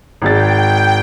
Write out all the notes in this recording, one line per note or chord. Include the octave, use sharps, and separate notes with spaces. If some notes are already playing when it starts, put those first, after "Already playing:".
G#1 G#3 G5 A6